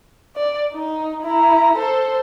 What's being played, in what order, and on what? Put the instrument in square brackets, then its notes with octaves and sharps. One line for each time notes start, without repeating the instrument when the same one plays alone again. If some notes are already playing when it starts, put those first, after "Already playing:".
[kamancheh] D5
D#4
E4 A#5
A4 C5